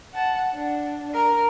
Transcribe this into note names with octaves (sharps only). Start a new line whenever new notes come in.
F#5 A5
D4
A#4